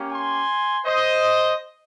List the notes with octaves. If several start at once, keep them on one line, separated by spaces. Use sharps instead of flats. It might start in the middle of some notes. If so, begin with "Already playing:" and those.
Already playing: A#3 C#4 G4
G#5 C6
C5 D#5